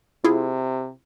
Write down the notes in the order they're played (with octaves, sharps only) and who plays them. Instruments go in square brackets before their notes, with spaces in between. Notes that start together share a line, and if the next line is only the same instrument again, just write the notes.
[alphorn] C3 [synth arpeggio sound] E4 F4 G#4